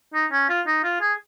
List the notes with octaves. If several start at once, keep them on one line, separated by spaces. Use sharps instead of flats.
D#4
C#4
F4
D#4
F4
G#4